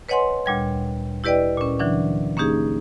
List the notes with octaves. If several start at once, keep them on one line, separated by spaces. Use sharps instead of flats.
B4 C#5 D#5 F#5 G#5 C6
D2 A#2 G3 G#6
E4 G4 B4 D5 D#5 G5
A#2 C#4
D3 E3 F#3 D4
A#3 C#4 D#4 G4 G#4